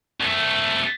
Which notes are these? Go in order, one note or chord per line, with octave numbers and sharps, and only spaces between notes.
C2 A3